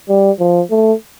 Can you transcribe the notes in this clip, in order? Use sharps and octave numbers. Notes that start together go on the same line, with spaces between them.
G3
F3
A3